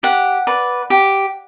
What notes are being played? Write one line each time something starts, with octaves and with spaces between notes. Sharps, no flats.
G4 F#5
B4 D5
G4